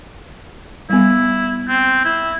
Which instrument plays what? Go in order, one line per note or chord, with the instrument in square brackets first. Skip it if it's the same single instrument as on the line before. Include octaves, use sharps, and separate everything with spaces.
[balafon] G3 B3 [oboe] E4
[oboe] C4
E4